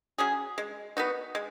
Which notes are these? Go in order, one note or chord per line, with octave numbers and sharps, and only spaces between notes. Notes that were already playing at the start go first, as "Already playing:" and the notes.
F#3 C#4 G#4
G#3
B3 D#4 F#4
G#3